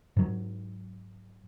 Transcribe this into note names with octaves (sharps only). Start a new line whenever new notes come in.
G#2 F#3